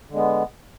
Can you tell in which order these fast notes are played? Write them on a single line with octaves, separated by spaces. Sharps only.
D3 G#3 B3